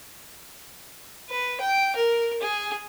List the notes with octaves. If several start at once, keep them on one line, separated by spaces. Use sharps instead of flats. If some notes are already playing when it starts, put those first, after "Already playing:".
B4
G5
A#4
G#4